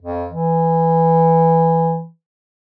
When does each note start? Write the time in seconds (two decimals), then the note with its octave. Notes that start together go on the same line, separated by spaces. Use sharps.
0.02 F2
0.30 E3